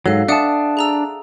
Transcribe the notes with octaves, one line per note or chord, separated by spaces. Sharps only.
G#2 F#3 A4 F5
D4 E5 F#5 A5 D#6
G#4 A#5 E6